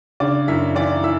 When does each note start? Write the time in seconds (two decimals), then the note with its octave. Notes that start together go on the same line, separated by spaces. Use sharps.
0.20 C#3 D4 D5
0.48 F#2 E4 E5
0.75 E3 D5 D6
1.04 E3 E5 E6